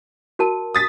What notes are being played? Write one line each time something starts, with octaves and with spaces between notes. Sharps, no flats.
F#4 A#4 A5
D#6 A6 B6